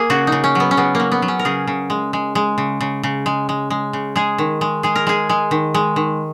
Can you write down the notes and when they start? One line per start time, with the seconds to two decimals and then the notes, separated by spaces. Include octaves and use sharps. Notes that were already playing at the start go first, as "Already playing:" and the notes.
Already playing: A#3 G#4 A#4
0.10 C#3 F#4
0.27 D#4
0.32 C#3
0.44 C#4
0.55 F#3 B3
0.71 C#4
0.77 C#3 B3
0.95 F#3 A#3
1.12 B3
1.22 F#3
1.28 C#4
1.39 A#4
1.45 C#3 G#4
1.67 C#3
1.90 G#3
2.13 G#3
2.35 G#3
2.58 C#3
2.81 C#3
3.03 C#3
3.26 G#3
3.49 G#3
3.70 G#3
3.93 C#3
4.16 G#3 G#4
4.38 D#3
4.61 G#3
4.83 G#3 G#4
4.96 A#4
5.07 G#3 G#4
5.30 G#3
5.51 D#3
5.74 G#3
5.96 D#3